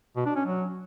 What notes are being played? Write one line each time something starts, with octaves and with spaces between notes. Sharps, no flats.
B2
D4
C#4
F#3